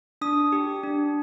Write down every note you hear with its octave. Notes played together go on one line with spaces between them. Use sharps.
D4 D#6
G4
D4